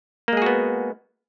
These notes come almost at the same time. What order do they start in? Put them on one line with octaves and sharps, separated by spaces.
A#3 G#3 G#4 F#4 B3